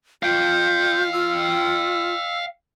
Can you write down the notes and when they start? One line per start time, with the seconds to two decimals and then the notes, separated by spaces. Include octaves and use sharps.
0.23 F4 F5 G5 G6
1.13 F4 E6